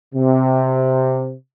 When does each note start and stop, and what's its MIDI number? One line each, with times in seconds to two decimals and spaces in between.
0.15 1.35 48